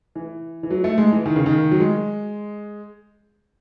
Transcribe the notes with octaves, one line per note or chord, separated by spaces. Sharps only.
E3
E3
F#3
A3
G#3
E3
D#3
C#3
D#3
F#3
G#3